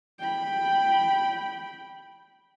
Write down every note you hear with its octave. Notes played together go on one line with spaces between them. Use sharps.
G5 B5